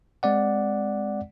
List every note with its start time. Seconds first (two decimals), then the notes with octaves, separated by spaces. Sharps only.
0.23 G#3 C4 D5 F#5